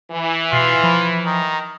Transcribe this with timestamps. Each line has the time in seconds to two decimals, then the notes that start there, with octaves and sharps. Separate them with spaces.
0.11 E3
0.53 B2 F4 C7
0.83 F3 B5
1.26 D#3 A#5